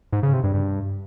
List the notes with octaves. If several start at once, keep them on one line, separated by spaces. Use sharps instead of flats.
G#2
C#3
C3
G2
G2